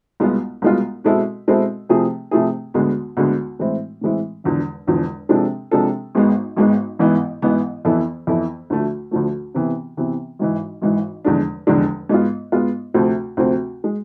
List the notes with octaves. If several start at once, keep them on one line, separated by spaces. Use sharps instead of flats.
C2 B2 G#3 B3 F4
C2 B2 G#3 B3 F4
B2 G#3 C4 E4 A4
B2 G#3 C4 E4 A4
C3 F3 A3 E4 G#4
C3 F3 A3 E4 G#4
D2 D3 G#3 B3
D2 D3 G#3 B3
A2 E3 G#3 C4 E4
A2 E3 G#3 C4 E4
E1 E2 D3 F3
E1 E2 D3 F3
C3 F3 G#3 D4 A4
C3 F3 G#3 D4 A4
G#1 G#2 G#3 B3
G#1 G#2 G#3 B3
A1 G#2 E3 B3
A1 G#2 E3 B3
F2 E3 B3 E4 A4
F2 E3 B3 E4 A4
D2 D3 F3 A3
D2 D3 F3 A3
C3 E3 B3
C3 E3 B3
G#1 G#2 E3
G#1 G#2 E3
F1 E2 D3 G#3 D4
F1 E2 D3 G#3 D4
G#2 G#3 B3 F4
G#2 G#3 B3 F4
D2 C3 F3 A3 C4
D2 C3 F3 A3 C4
G#3